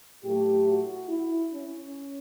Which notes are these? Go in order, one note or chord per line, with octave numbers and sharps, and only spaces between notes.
A2 F#3 A3 G4
F#4
E4
C#4